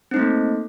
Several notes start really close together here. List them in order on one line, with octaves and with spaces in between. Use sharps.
C4 D#4 A3 A#3